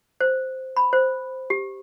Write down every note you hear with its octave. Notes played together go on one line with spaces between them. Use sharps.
C5
B5
C5
G4